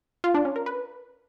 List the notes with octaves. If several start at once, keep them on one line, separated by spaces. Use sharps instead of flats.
F4
D4
C#4
A#4
B4